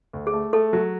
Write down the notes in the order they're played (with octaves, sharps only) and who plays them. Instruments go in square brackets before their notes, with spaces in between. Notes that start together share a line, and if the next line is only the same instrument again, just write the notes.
[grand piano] D2
[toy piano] G#4
[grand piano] A3
[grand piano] A3 [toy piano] A4
[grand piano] F#3